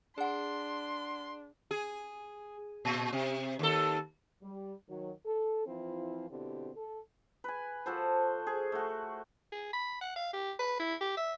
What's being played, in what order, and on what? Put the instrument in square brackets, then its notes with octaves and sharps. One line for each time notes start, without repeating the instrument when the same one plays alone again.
[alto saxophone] D4 [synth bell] G#4 F#5 [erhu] C6
[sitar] G#4
A#2
C3
D#2 A4
[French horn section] G3
D#3 F#3
A4
E3 F3 C4 E4 F4
B2 D3 C4 E4 G4
A4
[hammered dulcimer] B4 G#5
F3 F#4 A4 C5
G#4
A3 F#4
[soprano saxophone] G#4
B5
F#5
F5
G4
B4
E4
G4
E5